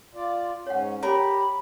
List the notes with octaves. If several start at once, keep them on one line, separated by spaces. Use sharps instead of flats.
F4 D5
G#2 C#4 C#5 F#5
G4 A#4 C#5 A#5 B5